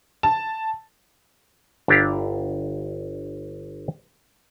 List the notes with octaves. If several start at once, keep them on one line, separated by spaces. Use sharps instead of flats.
A5
G1 D4 E4 G4 F5